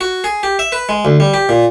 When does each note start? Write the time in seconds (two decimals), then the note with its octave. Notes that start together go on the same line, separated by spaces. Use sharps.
0.01 F#4
0.24 G#4
0.43 G4
0.59 E5
0.72 B4
0.89 G#3
1.05 D2
1.20 G3
1.34 G4
1.49 A#2